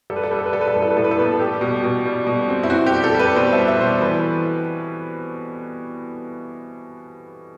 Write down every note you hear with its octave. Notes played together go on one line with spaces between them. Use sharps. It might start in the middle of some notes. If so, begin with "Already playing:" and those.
G3 A4
B4
A4
G3 B4
A4
B4
G3 A4
B4
A4
A2 B4
A4
B4
A2 A4
B4
A4
B3 B4
A4
G3 G4
B2
B2
G3
B2
C4
E4
C4 F#4
G4
G3
A4
G3 B4
B2 C5
E5
G3
E5
B2 C5
D5
E3 B4